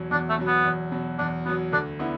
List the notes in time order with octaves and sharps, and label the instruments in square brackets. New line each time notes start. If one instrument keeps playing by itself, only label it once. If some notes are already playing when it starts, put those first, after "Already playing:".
Already playing: [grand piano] E2 B2 F#3
[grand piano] E2 [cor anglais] D4
[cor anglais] A3
[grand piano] B2 F#3
[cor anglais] B3
[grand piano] E2
B2 F#3
[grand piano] E2 [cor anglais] D4
[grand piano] B2 F#3 [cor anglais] B3
[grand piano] D2 [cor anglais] D4
[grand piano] D3 B3 E4